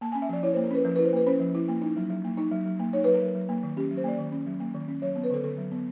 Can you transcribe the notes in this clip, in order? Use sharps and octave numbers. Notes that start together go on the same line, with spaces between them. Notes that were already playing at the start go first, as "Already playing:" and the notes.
A#3 A5
C#4 G#5
E5
F3 D5
E4 C#5
A#3 C5
A#4
C#4 B4
F3 A#4
E4 B4
C5
A#3 B4
C#4 C5
F3
E4
A#3
D#4
F#3
F#3
A#3
D#4
F#3
F#3
A#3
D#4 C#5
F#3 B4
A#4
F#3
F#3
A#3
D#3
C#4 G4
F#3
C5
A#3 D5
D#3
C#4
F#3
A#3
D#3
C#4
F#3 C#5
B3
B4
D3 A4
D3 A4
F#3
B3